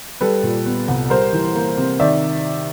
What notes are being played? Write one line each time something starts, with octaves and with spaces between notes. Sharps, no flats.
G3 A4 B4
A#2
B3
C2
G3 A#4 C5
E3
A#3
C3
D#3 D5 E5